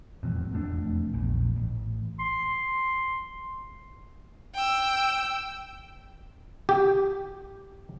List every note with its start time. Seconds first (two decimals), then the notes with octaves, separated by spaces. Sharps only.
0.23 E1 A1 F2
0.52 E1 F2 A3 D4
1.14 A#1 E2
1.56 A1
2.20 C6
4.55 G5 E6
6.69 G4